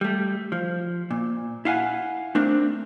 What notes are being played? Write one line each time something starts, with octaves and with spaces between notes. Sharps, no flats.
G3 A3
F3
A#2
E4 F5 F#5 G#5
A3 C4 D4 A#4